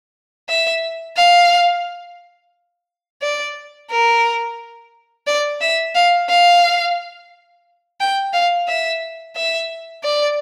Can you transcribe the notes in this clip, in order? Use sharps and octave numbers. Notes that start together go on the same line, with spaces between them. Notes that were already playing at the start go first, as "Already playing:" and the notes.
E5
F5
D5
A#4
D5
E5
F5
F5
G5
F5
E5
E5
D5